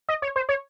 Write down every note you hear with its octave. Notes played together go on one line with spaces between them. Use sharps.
D#5
C#5
C5
C#5